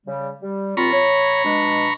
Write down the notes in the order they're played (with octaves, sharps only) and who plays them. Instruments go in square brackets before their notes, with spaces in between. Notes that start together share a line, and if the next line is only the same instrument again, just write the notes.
[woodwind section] C#3 G3
G3
[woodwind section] D#2 C4 F4 [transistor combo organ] A#5 B5 C#6
[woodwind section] C#5
B2 G#3 D4